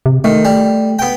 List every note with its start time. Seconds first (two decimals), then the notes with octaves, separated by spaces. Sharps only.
0.06 C3
0.24 D#3 A3
0.45 G3
0.99 B3 G5